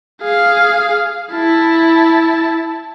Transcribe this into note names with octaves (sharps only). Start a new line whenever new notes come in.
G#4 F5
E4 A5